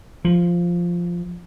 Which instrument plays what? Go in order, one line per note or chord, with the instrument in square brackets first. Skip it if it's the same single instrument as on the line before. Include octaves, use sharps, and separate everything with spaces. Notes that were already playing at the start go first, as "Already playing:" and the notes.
[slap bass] F3